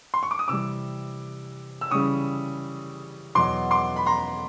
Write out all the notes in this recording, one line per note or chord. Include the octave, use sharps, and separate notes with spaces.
C6
C#6
D6
D#6
C3 E3 G3 D6 E6
E6
C#3 E3 G3 C#6 D#6
E2 B2 F#3 C6 D6
C6 D6
B5
A#5 C6